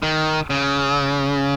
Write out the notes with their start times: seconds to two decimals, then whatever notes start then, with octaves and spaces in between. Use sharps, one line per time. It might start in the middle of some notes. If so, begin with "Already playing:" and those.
0.03 D#3
0.50 C#3